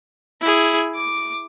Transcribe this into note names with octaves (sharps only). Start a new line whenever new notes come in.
E4 G#4
D6